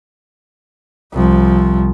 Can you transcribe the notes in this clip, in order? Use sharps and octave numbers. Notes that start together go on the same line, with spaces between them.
C2 F3